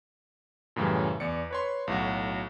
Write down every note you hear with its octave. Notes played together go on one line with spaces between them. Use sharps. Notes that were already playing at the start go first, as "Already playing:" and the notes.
F#2 A2 C#3 E3 G3
E2 D5 C#7
B4 C#5 C6
B1 A2 F#3 F#4